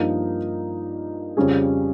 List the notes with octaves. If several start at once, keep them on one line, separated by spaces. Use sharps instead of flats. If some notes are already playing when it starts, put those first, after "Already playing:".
Already playing: G2 F3 A#3 D#4 A#4
F2 C#3 G3 C#4 G#4